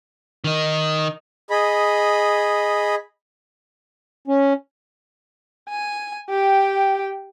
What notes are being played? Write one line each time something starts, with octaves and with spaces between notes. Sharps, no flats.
D#3 D#4
G#4 D#5 B5
C#4
G#5
G4 G5